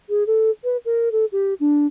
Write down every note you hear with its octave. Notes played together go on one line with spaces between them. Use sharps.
G#4
A4
B4
A#4
A4
G4
D4